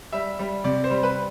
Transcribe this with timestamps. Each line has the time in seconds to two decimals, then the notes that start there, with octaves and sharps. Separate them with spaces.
0.13 G3 E5
0.39 G3
0.64 C3 D5
0.84 C5
0.90 G3
1.03 B4